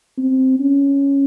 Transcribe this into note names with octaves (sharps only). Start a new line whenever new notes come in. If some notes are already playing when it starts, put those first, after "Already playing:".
C4
C#4